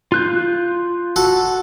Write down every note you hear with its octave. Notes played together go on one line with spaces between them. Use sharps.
F4 F#6 G6
F#4 A4 A5